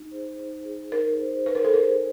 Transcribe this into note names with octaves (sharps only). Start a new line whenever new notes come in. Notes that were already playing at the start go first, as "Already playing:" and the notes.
Already playing: D#4
G#4 C5
D#4
G#4 C5
D#4 A#4
G#4 C5
D#4 B4
A#4
A4
G#4 A#4 C5